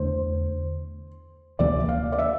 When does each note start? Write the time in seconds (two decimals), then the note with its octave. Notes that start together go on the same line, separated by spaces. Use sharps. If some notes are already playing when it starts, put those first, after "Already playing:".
Already playing: E2 D3 A3 C5
1.59 D2 C3 E3 A#3 D5
1.89 F5
2.12 D5
2.19 E5